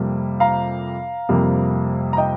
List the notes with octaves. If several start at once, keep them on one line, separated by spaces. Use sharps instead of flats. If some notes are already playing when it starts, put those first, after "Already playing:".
Already playing: F2 C3 G3 A#3
F5 A#5
F2 C3 G3 A#3
A#5
D#5 G5